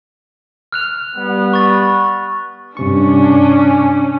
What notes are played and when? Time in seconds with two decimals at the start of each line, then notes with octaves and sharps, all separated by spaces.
0.72 F6 F#6 F7
1.15 G3 B3
1.53 C#6 A6
2.77 G2 C3 C#4 D4 C#6